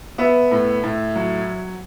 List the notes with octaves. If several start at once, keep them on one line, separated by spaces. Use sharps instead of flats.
B3 E5
A2
A2
F#3